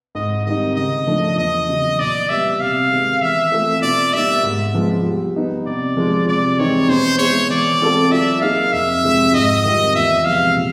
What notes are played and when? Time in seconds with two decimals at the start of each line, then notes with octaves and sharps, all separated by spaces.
0.15 G#2 D#5
0.46 D#3 G3 C4 D#4 D#5
0.76 C#3 D#5
1.07 F3 A3 D4
1.37 E2 D#5
1.68 C#3 F#3
1.99 A#2 D5
2.29 G3 B3 E5
2.60 C3 F5
2.91 D#3 G#3 B3
3.22 E3 E5
3.52 A3 C4 F4 A4
3.82 B2 D5
4.13 G3 A#3 D#4 E5
4.44 G#2
4.74 F3 G#3 B3
5.05 G3
5.36 B3 D#4
5.66 C3 D5
5.97 F3 G#3
6.28 C3 D5
6.58 E3 G#3 C4 D#4 C#5
6.89 B2 C5
7.19 G#3 B3 E4 G#4 C#5
7.49 E3 D5
7.81 G#3 C4 F4 A4
8.11 F#3 E5
8.42 A#3 D#4 G#4 F5
8.73 F2 E5
9.03 C3 F3 G#3 C4
9.34 G#2 D#5
9.64 D#3 G3 C4 F4
9.95 E2 E5
10.25 C3 F3 G#3 B3 F5
10.56 A#2